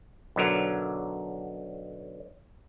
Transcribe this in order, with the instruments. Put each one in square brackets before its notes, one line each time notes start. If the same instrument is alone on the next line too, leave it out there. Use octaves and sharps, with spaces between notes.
[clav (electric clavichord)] B1 D3 F#3 A#4